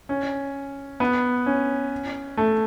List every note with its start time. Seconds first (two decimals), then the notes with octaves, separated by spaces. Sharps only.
0.09 C#4
1.00 B3
1.46 C#4
2.37 A3